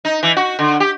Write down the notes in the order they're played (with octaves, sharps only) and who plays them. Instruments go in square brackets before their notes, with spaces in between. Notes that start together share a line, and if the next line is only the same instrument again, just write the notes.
[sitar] D#4
E3
F#4
D3
G4